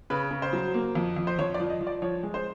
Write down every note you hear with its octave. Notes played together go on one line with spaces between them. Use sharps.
C#3 B4
C#3
C5
F#3
A#3
F2
F2
C5
F2 C#5
D5
F3
D#5
F3
D5
F3 C#5
G#3
C5